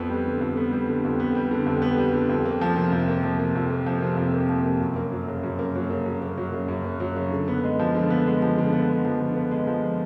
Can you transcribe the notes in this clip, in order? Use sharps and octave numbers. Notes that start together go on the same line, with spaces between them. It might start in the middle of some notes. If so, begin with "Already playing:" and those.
Already playing: F2 B3
G3
D3
F2
B3
G3
D3
F2
B3
G3
D3
F2
B3
G3
D3
F2
A#3
F3
C3
F2
A#3
F3
C3
F2
A#3
F3
C3
F2
A#3
F3
C3
F#2
A#3
F#3
C#3
F#2
A#3
F#3
C#3
F#2
A#3
F#3
C#3
F#2
A#3
F#3
C#3
D3
B3
G#3
F3
D3
B3
G#3
F3
D3
B3
G#3
F3
D3
B3
G#3
F3